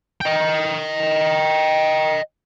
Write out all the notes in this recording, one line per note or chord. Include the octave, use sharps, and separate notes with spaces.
D#5 G5